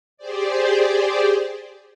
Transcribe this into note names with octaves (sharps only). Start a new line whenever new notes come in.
G4 G#4 C5 D5